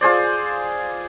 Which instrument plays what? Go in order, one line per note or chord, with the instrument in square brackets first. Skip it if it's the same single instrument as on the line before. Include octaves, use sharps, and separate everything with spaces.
[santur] F4 G#4 C5 D5